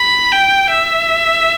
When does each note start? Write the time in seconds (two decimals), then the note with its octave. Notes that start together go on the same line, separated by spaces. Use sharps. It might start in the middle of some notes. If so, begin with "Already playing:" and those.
Already playing: B5
0.31 G5
0.70 E5